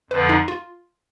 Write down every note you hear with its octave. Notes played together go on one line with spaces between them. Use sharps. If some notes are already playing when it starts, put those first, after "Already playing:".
F2 D3 F3 B4
D#4
F4